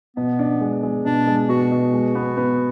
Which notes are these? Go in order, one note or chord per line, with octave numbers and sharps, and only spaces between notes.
B2 B3
D4
G#3
G#3
B2 D4
G#3
B2 F#4
B2
G#3
B3
B3